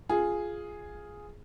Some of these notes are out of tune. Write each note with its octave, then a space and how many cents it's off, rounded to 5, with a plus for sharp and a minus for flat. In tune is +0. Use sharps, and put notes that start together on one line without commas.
F4 +0 G#4 +0